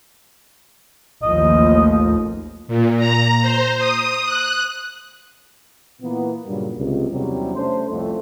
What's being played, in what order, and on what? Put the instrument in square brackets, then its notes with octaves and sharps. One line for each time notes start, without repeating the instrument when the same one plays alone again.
[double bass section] A1 D#2 F3 [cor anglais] D#5
[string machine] A#2
A#5
C5
D#6
F#6
[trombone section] A#2 E3 A#3 B3
G2 A#2 C#3 F#3 G3
C#2 C3
E2 C3 F#3 G3 C#4
A3 C#4 D4 C5
C2 F2 A3